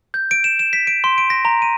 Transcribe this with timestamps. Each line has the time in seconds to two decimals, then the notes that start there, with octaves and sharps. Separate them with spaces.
0.14 G6
0.31 D7
0.44 E7
0.59 E7
0.73 B6
0.87 D7
1.04 C6
1.18 D7
1.30 A#6
1.45 A#5
1.62 D#7